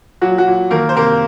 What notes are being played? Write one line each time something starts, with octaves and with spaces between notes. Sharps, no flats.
A#2 F#3 F#4
F#3 F#4
A#2
D#3 A#3 A#4
C5
C3 A#3 A#4